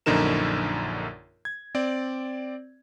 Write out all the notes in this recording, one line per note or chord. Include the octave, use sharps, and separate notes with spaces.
A#1 F#2 D3 D#4 A#4 E7
G#6
C4 D5